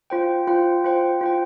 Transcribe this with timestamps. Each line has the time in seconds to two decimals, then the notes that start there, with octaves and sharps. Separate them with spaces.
0.10 F4 C5 G5
0.48 F4 C5 G5
0.84 F4 C5 G5
1.21 F4 C5 G5